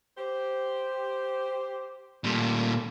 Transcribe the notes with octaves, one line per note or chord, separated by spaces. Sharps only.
G4 C5
A#2 G3 A3